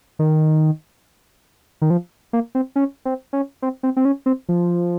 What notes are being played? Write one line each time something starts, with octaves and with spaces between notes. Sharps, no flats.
D#3
D#3
F3
A#3
C4
C#4
C4
C#4
C4
C4
C4
C#4
C4
F3